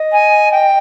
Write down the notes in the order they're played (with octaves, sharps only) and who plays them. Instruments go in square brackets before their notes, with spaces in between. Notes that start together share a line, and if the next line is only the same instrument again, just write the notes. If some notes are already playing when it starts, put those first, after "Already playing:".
Already playing: [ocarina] D#5
[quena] G#5
G5